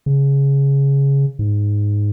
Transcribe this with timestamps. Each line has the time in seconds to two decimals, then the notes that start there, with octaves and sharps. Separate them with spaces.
0.06 C#3
1.39 G#2